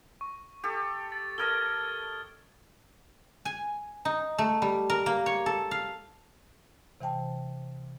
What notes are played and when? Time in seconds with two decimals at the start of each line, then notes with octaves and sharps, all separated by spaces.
0.21 C#6
0.64 G4 A4
1.12 A6
1.38 A4 A#4 D#5 F6 G#6 G7
3.45 G#5
4.05 D#4
4.38 A3
4.62 G3
4.90 A#4
5.06 A#3
5.26 C#5
5.46 A4
5.71 F5
7.01 C3 E3 C5 G5 A5